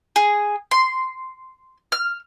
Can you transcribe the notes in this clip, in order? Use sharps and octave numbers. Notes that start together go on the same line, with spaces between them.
G#4
C6
F6